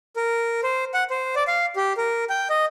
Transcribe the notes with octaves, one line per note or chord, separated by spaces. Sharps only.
A#4
C5
F#5
C5
D5
F5
G4
A#4
G5
D#5